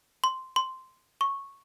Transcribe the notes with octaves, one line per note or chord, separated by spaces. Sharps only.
C6
C6
C#6